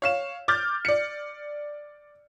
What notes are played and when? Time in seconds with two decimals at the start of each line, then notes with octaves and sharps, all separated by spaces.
0.02 C#5 F5 E7
0.48 D6 F6 G6 A6
0.85 D5 C#7